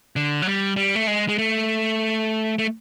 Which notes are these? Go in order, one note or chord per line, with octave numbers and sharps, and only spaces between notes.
D3
F#3
G3
G3
A3
G#3
G#3
A3
A3